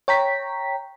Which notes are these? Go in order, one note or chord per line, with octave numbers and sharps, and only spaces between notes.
C#5 G5 A#5 B6